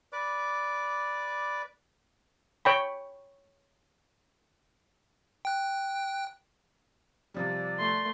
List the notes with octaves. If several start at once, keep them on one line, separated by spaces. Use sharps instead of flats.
B4 D5 D6
C#5 G5 B5
G5 F#6
C3 F3 G3 D5
A3 C6